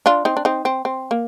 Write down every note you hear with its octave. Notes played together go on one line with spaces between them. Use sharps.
D4 F4
C4 D#4
D4
C4 D#4
C4
C4
A#3